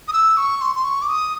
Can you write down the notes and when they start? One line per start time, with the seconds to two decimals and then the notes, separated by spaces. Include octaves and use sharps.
0.08 D#6
0.13 E6
0.37 C#6
0.61 C6
0.75 C6
0.84 C#6
1.02 D6
1.08 D#6